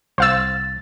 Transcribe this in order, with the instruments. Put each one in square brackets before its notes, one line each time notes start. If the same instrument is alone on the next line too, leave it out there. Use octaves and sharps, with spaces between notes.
[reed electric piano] C2 A6 [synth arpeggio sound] C5 F5 E6